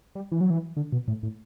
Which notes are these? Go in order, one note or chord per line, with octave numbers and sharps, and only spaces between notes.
G3
E3
F#3
E3
D3
B2
A2
A2